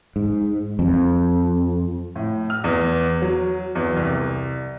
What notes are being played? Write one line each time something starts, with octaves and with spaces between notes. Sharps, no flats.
G#2
F2
A2
F6
E2
F#3
E2
C2